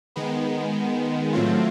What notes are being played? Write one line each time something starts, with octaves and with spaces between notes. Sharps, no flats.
D#3 G#3 B3
A2 F#3 A3 C4 F4